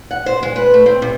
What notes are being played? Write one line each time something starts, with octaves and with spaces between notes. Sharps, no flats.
F#5
C5
G#3
B4
A3
C4
C3